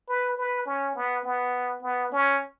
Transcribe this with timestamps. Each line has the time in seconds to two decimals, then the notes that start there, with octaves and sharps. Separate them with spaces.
0.09 B4
0.37 B4
0.66 C#4
0.96 B3
1.25 B3
1.82 B3
2.12 C#4